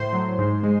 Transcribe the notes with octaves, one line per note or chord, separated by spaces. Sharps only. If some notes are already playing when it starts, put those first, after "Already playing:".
Already playing: A2 C5 C6
F#3
G#2
G#3